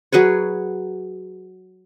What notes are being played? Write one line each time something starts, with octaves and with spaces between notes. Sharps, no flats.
F#3 G#4 B4 C#5